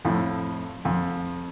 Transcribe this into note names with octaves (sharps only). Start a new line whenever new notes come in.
F2 A2
F2